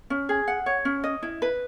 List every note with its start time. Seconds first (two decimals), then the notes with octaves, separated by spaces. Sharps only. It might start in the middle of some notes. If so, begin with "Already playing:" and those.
0.10 C#4
0.29 G#4
0.47 F#5
0.66 C#5
0.85 C#4
1.04 D#5
1.23 E4
1.42 B4